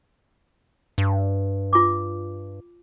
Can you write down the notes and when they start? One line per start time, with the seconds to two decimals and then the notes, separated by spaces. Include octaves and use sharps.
0.98 G2
1.73 F4 D6